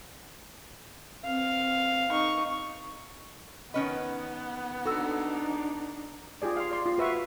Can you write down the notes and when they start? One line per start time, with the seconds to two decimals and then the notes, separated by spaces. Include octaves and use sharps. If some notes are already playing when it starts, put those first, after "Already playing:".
1.25 C4 F5
2.11 D#4 C#6
3.74 D#3 B3 C#4 B4 D#5
4.85 D4 D#4 F#4 A4 E6
6.42 F4 G4 G#4 D5
6.57 F5 C6
6.71 D5 C6
6.86 F4
6.98 F#4 B4 E5 F5 C#6